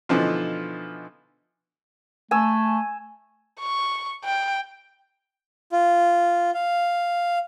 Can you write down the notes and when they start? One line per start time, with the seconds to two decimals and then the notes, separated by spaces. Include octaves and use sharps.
0.09 B2 D3 E3 F3 D#4 F4
2.31 A3 G#5 E6
3.60 C#6
4.25 G5
5.72 F4
6.54 F5